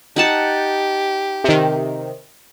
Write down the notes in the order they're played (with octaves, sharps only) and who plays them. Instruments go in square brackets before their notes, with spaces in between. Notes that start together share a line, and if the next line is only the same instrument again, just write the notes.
[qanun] D#4 F#5 A5 [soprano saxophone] G4
[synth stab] C3 D#3